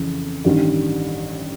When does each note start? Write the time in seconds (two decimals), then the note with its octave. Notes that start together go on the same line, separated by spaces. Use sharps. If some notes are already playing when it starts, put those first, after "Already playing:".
Already playing: F2 C#3 E3
0.44 A1 G2 D#3 G3